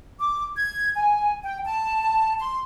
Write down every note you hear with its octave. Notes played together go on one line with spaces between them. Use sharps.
D6
G#6
G#5
G5
A5
C6